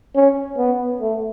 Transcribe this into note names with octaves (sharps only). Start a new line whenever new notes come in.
C#4
B3
A3